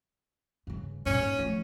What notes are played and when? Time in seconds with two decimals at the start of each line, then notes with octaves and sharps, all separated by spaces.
0.67 G2 C#3
1.06 G2 A#2 C#4
1.19 G#2
1.39 F3 A3